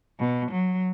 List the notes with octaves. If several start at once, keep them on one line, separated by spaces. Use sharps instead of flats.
B2
F#3